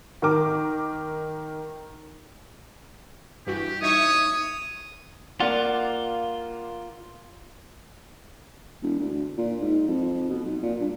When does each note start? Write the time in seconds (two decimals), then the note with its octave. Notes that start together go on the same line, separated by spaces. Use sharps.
0.22 D#3 A#4 D6
3.47 G2 E3 F#4 G4
3.82 D#4 C#5 E5 C#6 D#6
5.40 A#3 F4 D5 F#5
8.82 E1
8.99 D2
9.37 A#2
9.61 G#2
9.88 F2
10.30 B2
10.45 B1
10.62 A#2
10.80 G2